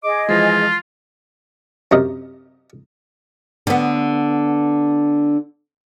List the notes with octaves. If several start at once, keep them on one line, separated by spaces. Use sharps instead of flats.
G#4 D#5 D6
E3 F3 G#3 F4
F#2 C3 A#4 D#5
D3 B3